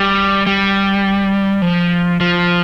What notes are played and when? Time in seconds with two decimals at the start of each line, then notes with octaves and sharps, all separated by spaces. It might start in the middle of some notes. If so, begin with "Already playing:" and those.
Already playing: G3
0.47 G3
1.62 F3
2.20 F3